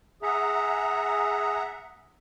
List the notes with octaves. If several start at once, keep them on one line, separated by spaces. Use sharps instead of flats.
G#4 E5 F#5 A#5